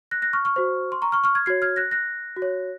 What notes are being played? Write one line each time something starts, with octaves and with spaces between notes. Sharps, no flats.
F#6 A#6
F#6 A#6
C#6 F6
C#6 F6
F#4 C5
C6
A#5 C#6
C#6 F6
C#6 F6
F6 G#6
F#4 C#5 G#6 C7
F6 G#6
F#6 A#6
F#6 A#6
F#4
C#5